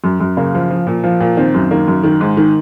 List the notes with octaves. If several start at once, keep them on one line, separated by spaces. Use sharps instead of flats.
F#2
F#2
C#3 A#3
F3
F3
A#2
F3
A#2
D#3 C4
F#2
D#3 A#3
F#2
D#3
G#2
D#3